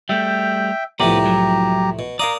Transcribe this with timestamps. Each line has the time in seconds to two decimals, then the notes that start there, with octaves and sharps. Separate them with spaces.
0.09 G3 A3 E5 G5
1.00 C2 A2 F3 B3 G4 D5 A#5
1.26 F#3
1.99 B2
2.19 A#4 D5 F5 A#5 D#6